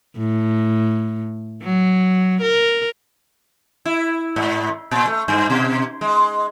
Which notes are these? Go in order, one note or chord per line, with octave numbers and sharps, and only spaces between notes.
A2
F#3
A#4
E4
G#2
A#2
A3
G2
B2
G#3